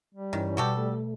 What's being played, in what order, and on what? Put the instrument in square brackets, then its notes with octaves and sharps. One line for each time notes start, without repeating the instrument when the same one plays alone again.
[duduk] G3
[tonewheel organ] G2 E3 C#4 [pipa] D#3
[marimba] B2 [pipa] F#4 G4 A4
[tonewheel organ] A3